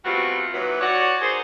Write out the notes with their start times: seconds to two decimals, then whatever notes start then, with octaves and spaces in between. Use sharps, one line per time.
0.05 G3 A3 B3 C4 F4 F#4
0.53 D#2 E3 F#3 B4
0.80 F#4 C#5 D5
1.21 D#4 G#4 A#4 C5